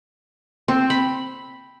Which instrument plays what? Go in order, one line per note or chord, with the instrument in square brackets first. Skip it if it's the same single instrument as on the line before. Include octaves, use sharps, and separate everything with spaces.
[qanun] C4
B5